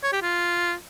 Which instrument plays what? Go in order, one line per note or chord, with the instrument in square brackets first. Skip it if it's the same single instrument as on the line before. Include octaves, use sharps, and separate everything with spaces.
[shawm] C#5
G4
F4